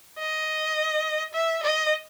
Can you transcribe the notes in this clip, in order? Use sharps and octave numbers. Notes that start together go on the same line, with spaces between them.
D#5
E5
D#5